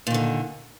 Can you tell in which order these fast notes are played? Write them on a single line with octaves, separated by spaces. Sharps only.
A#2 D#3 D3